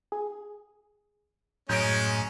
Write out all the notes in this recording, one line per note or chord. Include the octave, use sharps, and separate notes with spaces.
G#4
F#2 A2 G#3 C#4 G6 D7